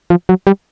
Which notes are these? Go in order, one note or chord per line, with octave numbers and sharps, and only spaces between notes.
F3
F#3
G3